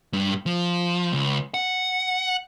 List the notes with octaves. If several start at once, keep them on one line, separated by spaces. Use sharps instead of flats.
G2 G3
F3
C#2
F#5